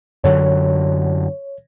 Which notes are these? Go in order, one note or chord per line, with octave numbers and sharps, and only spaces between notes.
F#2 D3 F#3 C#5